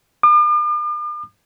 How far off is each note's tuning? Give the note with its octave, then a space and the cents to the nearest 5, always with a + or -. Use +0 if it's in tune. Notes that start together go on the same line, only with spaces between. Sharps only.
D6 +45